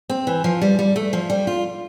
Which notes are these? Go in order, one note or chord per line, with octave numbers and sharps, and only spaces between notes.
C4
E3
F3
G3
G3
A3
F3
G3
F4